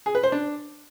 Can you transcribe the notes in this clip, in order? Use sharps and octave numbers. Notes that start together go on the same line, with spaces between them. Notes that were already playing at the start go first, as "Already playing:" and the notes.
G#4
B4
C5
D4